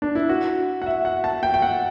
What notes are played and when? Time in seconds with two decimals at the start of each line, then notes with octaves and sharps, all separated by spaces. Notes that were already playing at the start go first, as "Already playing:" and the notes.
0.02 D4
0.15 E4
0.29 F#4
0.82 F#5
0.86 E5
1.05 F#5
1.24 A5
1.43 G5
1.54 G5
1.62 F#5